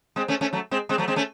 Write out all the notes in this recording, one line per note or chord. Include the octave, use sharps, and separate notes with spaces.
G#3 C4
A3 C#4
A3 C#4
F#3 A3
G#3 C4
G#3 C4
F#3 A3
G#3 C4
A3 C#4